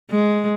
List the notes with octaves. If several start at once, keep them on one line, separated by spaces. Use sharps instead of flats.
G#3